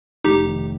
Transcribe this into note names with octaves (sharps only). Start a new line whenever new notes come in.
F1 D#4 G4
D#3